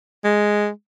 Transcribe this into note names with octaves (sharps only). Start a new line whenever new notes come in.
G#3